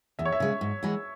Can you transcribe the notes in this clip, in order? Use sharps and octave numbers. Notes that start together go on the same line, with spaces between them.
E2 E5
C#5
E5
C#3 G#3
G#2
E3 G#3 B3